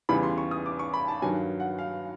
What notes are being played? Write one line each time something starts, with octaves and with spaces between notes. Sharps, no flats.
E2 C#3 E3 G3 B5
C6
C#6
D#6
D6
C#6
B5
A5
G2 D#3 F#3 G#5
F#5
F5